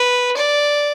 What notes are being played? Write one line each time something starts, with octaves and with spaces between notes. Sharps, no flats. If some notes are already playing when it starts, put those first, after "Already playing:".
Already playing: B4
D5